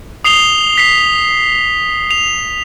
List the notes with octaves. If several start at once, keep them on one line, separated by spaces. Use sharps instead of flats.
D#6 C7 F7 G7
B6 C7
F7